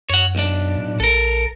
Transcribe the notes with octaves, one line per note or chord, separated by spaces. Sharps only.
F#2 C#5 F#5
B1 D4
A2
A#1 A4 A#4